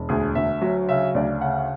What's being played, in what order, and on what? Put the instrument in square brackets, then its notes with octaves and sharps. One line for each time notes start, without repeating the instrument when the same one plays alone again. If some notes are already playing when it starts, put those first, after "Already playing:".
Already playing: [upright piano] E1
D2 G#4
D2 E5
F#3
C#3 E5
D2 D5
C#3 F#5